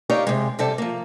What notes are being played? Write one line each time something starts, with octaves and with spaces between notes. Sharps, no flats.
D#4 G4 A#4 C#5 D5 F5
C3 G#3
C3 G3 A4
F3 A#3